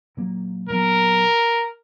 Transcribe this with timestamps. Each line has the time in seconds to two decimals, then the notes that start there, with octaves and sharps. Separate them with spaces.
0.17 A#2 F#3 A#3
0.69 A#2 F#3 B3 A#4